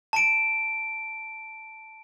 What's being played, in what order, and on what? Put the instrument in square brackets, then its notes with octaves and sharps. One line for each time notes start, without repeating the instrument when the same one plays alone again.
[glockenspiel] A5 D7